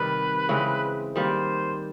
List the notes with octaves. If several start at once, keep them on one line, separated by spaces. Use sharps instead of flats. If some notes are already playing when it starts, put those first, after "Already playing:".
Already playing: C3 D#3 G3 B4
C#3 E3 G#3 C4
D#3 G3 A#3 C5